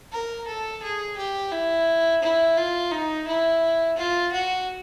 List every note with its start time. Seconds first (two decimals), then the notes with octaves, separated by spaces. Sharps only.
0.12 A#4
0.47 A4
0.82 G#4
1.17 G4
1.51 E4
2.22 E4
2.57 F4
2.91 D#4
3.27 E4
3.97 F4
4.32 F#4